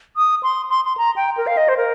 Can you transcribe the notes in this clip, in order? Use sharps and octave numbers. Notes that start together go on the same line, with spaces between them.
D#6
C6
C6
C6
A#5
G5
A#4
F5
D#5
C5
A#4